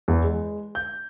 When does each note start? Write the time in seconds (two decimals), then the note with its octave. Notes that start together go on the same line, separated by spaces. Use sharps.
0.08 E2
0.24 G#3
0.75 G6